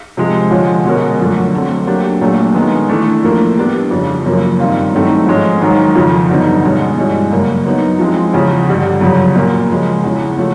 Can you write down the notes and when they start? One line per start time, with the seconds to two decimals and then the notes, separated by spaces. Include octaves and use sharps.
0.17 C3 F3 G#3
0.51 D3 F3 G#3 C#4
0.85 B2 G#3 C#4 F#4 A#4
1.19 F#2 D3 F3 A3 D4
1.54 F#3 A3 C4
1.87 F#3 A#3 D4 G4
2.21 A#2 F#3 A3 D4
2.55 D#3 G#3 B3
2.89 E3 A3 D4
3.23 A2 F3 A#3
3.57 G3 B3 D4
3.91 F2 C#3 F3
4.26 F#2 C#3 F3 A#3 C#4
4.60 G2 D#3 G3 C4 F4
4.93 A2 F#3 A3 C4 D#4
5.27 G#2 F3 G#3 C#4
5.61 G#2 D#3 F#3
5.95 F2 C#3 F3
6.30 G2 D3 F#3 B3 D#4
6.63 B2 G#3 C#4
6.98 G2 E3 G#3 C#4 F#4
7.31 F#2 C#3 F#3 A#3
7.65 F#3 B3 D#4
7.99 F3 G#3 C4 E4
8.33 E2 C#3 F3
8.68 G2 D3 G3
9.01 F#2 C#3 F3
9.35 A#2 F#3 A#3
9.70 C#3 F3 G#3
10.03 E2 C#3 E3
10.38 C#3 F3 A3